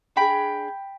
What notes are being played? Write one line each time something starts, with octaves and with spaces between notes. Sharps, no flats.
D4 G#4 G5 B5